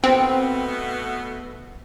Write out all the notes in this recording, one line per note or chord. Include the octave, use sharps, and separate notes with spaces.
B2 A3 B3 C4